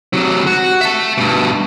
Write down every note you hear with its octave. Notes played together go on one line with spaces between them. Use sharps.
C3 F#3
F#4
E5 A5
G2 B2